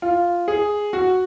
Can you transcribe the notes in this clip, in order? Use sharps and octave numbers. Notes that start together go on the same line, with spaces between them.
F4
G#4
F#4